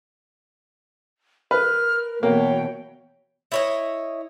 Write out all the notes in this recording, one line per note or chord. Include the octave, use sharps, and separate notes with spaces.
A#4 B4 F6
B2 E3 A#3 C#5 G5
E4 C#5 D#5